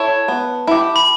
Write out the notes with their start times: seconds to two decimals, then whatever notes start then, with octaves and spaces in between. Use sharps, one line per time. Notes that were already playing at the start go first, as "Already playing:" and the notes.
Already playing: E4 A4 C#5 A5
0.28 B3
0.67 E4 G4
0.96 B5